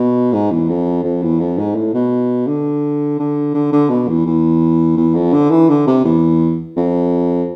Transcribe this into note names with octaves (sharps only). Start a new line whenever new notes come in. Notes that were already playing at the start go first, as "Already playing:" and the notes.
Already playing: B2
G#2
E2
F2
F2
E2
F2
G#2
A2
B2
D3
D3
D3
D3
B2
E2
E2
E2
F2
D3
E3
D3
C3
E2
F2